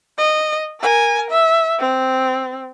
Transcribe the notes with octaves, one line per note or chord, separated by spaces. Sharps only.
D#5
A#4 G#5
E5
C4